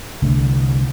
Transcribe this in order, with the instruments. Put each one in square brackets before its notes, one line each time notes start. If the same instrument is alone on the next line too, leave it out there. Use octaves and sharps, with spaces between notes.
[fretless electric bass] C2 D3 A3